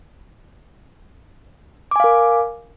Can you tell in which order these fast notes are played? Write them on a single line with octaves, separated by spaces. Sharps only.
D6 G#5 F5 A#4